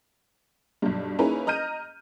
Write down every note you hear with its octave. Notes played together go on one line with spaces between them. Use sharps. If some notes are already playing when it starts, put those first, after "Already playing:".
B1 G2
A#3 C#4 D#4 E4 G#4 B4
D#5 A#5 F6 G6 D#7